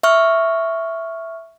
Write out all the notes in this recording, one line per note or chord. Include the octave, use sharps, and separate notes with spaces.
E5 C#6 F6